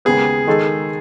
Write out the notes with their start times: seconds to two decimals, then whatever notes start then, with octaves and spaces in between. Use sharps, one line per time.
0.05 D#2 C#3 G#3 B3 G#4
0.47 D#3 G#3 D#4 A4